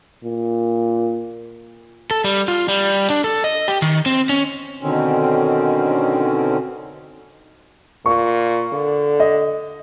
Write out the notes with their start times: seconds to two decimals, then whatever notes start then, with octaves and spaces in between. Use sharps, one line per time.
0.24 A#2
2.11 A4
2.24 G3
2.48 F4
2.68 G3
3.10 D4
3.24 A4
3.44 D#5
3.68 G4
3.82 D#3
4.06 C4
4.29 C#4
4.81 B2 D3 D#3 C4 C#4
8.06 A#2 C#6
8.73 D3
9.20 D#5